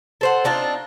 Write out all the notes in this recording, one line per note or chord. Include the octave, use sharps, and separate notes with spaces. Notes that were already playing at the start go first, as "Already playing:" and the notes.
A4 C5 F#5
C4 D4 D#4 F4